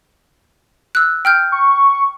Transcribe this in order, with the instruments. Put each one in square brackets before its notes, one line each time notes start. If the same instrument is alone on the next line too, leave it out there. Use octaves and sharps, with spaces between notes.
[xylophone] E6 F#6
G5 F6 G6
[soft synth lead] C#6